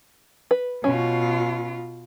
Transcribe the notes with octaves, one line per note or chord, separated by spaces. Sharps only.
B4
B2 C#4 F4